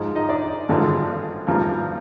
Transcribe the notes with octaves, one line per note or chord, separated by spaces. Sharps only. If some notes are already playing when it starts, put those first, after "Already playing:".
Already playing: G#2 F3 G#3
D#4 D#5
D4 D5
G#1 G2 D3 F3 G#3
G#1 G2 F3 A#3 A#4